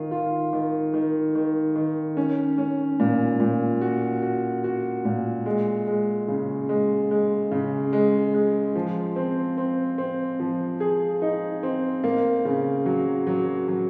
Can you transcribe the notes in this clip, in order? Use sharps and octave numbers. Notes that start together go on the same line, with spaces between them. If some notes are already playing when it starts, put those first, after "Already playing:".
Already playing: D#3 F4
F4
D#3
D#3
D#3
D#3
C#4
C#4
A#2
A#2
F#4
F#4
F#4
A#2
G#3
G#3
C#3
G#3
G#3
C#3
G#3
G#3
F3
C4
C4
C4
F3
G#4
D#4
C4
A#3
C#3
F#3
F#3
F#3